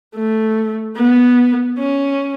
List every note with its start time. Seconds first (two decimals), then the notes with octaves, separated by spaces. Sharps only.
0.15 A3
0.96 B3
1.79 C#4